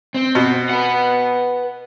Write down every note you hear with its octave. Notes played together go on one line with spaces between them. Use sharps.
C4
B2
B4 F#5